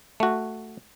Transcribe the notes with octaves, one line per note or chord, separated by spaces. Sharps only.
A3 F#4